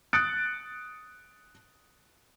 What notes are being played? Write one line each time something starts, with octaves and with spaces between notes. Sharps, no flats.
D#6 F#6 A6 C#7 D7